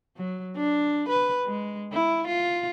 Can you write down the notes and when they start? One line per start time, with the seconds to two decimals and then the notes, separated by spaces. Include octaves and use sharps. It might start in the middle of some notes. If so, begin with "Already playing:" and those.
0.17 F#3
0.56 D4
1.09 B4
1.46 G#3
1.93 E4
2.27 F4